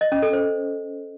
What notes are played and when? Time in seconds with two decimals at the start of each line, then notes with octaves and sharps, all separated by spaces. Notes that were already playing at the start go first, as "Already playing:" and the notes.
0.01 D#5
0.12 C#4
0.22 A4
0.33 C5